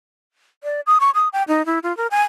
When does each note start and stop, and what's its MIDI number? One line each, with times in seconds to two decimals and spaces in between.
0.64 0.81 74
0.87 0.98 87
1.00 1.10 85
1.15 1.28 87
1.33 1.43 79
1.48 1.65 63
1.66 1.79 64
1.83 1.95 65
1.97 2.07 70
2.11 2.22 80